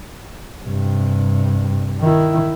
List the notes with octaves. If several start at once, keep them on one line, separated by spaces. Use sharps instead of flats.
G2 C3
D#3 E4